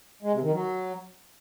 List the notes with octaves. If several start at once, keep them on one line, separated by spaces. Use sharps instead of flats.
G#3
C3
D#3
F#3